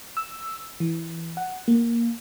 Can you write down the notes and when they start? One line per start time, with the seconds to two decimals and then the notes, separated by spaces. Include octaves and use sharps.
0.17 E6
0.80 E3
1.37 F#5
1.68 A#3